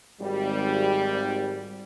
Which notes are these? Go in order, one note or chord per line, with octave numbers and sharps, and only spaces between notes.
G#1 G3